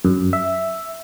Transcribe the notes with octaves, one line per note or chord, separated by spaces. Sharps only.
F#2
E5